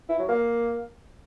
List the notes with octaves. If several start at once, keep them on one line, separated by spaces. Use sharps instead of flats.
E4
F#3
A#3